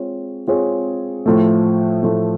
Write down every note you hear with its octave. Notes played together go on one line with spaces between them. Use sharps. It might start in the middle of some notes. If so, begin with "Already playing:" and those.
Already playing: G#3 C4 F4 G#4 C#5
G#3 C4 F4 G#4 C#5
A2 F3 A3
A2 F3 A3